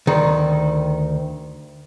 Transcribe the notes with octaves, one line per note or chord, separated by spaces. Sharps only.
D2 D#3